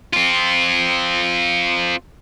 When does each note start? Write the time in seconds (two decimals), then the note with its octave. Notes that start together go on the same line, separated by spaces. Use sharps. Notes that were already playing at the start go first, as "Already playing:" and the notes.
0.13 C4 F4